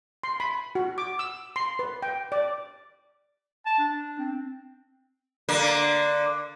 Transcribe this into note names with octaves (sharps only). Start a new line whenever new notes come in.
C6
B5
F#4
D6
E6
C6
B4
G5
D5
A5
D4
C4
D3 A#3